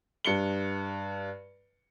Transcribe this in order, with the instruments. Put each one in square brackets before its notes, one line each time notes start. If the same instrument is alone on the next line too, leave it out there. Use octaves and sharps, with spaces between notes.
[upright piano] G2 C#7 G7